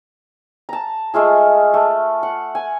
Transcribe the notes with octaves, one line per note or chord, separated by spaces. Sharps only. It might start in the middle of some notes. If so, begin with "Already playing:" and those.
A5 A#5
G#3 A3 F4 G#4
A3
F#5
G#5